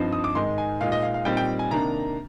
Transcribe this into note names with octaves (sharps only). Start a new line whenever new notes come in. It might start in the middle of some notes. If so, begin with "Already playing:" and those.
Already playing: G2 F3 C4 D#4
D#6
D6
G#2 D#3 G#3 D#4 C6
G#5
A#2 G#3 D#4 F5
D#5
F5
F5
A#2 G3 C4 D#4 G5
G5
G#5
C3 D#3 A#3 D4 A#5